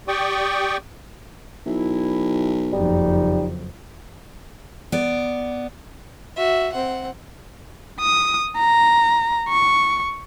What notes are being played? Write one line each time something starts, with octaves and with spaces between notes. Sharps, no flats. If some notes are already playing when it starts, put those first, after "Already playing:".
G4 D5 G5 C#6 D#6
B1 E4
F#1 F2 G3 D#4
B3 D5
F#4 E5
C4 F#5
D#6
A#5
C#6